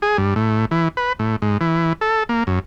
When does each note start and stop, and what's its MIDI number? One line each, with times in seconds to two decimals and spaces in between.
0.02 0.17 68
0.18 0.34 43
0.36 0.65 45
0.71 0.88 52
0.97 1.13 71
1.19 1.36 45
1.42 1.58 44
1.61 1.93 52
2.01 2.23 69
2.29 2.44 58
2.47 2.59 42